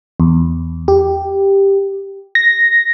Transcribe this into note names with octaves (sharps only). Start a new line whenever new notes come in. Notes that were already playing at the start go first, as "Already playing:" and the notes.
E2
G4
A#6